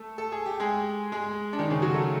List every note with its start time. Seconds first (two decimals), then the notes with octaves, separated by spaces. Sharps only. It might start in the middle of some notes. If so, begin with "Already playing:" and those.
Already playing: A3 A4
0.18 A4
0.32 G#4
0.46 G4
0.60 G#3 G#4
1.12 G#3 G#4
1.53 D4
1.59 D#3 D#4
1.70 C#3 C#4
1.82 F#3 F#4
1.94 A3 A4